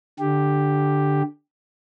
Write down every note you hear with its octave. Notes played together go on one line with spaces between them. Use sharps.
D3 G4